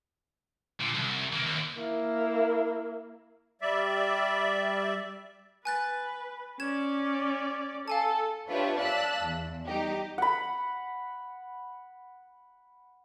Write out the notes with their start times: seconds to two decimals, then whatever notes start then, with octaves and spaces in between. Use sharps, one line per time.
0.81 A#2 D3
0.95 C2
1.33 E3 A#3
1.46 D#2
1.79 A#3 E4
3.61 G3 D5 E5
5.65 B4 G#5 F#6 A6
6.60 C#4 D5 G#6 E7
7.88 A4 F5 G#5 A5
8.49 D4 F4 G4 B4 C#5 E5
8.78 D5 F5 A5 E6 F#6 B6
9.24 E2
9.67 G3 D#4 G4
10.18 F#5 B5